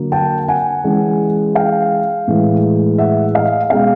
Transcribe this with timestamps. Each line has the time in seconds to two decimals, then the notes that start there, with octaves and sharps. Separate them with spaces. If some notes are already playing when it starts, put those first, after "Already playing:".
Already playing: D3 F#3 A#3
0.12 G5 A5
0.48 F#5 G#5
0.84 E3 G#3 C#4
1.55 F5 G5
2.27 A2 E3 G#3
2.98 E5 F#5
3.34 D#5 F5
3.70 B2 G#3 C#4 F5 G5